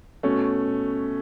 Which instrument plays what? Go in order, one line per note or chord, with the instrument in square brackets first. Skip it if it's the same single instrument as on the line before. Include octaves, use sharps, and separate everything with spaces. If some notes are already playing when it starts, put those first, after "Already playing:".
[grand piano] B2 A3 C#4